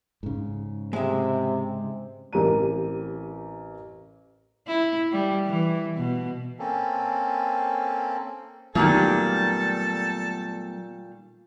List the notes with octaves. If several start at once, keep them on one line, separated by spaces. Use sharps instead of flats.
G#2 C#3
C3 G#3 E5
A1 C4 G4 A#4 A#5 D#7
E4
G3
E3
B2
A#3 C4 C#4 A4
A#2 D#3 F#3 G3 A3 B3 A4